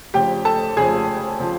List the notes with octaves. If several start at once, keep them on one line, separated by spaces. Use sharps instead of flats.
F1 F2 C#3 F3 G4 G5
A4 A5
F1 F2 C#3 F3 G#4 G#5
C#3 F3